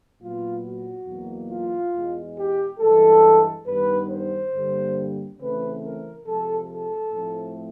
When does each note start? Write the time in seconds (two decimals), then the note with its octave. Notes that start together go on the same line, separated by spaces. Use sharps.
0.21 A#2 F#3 B3 F4
0.65 F#4
1.07 E2 B2 F#3 A#3
1.50 F4
1.94 E2 B2 G#3
2.38 G4
2.80 G2 E3 G#3 A4
3.67 G2 D#3 G3 B3 B4
4.10 C5
4.54 G2 D3 G3 A#3
5.39 C#3 E3 A3 C4 B4
5.83 A#4
6.26 C3 F3 G#3 A4
6.69 A4
7.12 A2 F3 A3 C4